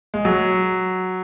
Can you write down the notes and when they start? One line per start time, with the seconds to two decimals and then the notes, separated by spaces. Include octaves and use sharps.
0.14 G#3
0.25 F#3